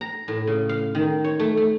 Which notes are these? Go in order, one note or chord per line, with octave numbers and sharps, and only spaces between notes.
A#5
A2
C#3
F5
D#3
C#5
A3
A3